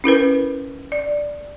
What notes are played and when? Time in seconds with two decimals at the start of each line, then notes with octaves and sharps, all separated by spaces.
0.04 C#4 E4 A#4 B4
0.92 D5